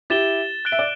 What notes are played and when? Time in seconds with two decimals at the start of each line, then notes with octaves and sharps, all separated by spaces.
0.10 E4 G4 A6 E7 G7
0.65 F#6 A6 D7 G7
0.72 E5
0.79 D5